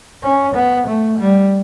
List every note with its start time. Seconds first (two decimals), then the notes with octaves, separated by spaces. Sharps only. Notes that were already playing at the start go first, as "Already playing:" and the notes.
0.23 C#4
0.55 B3
0.87 A3
1.19 G3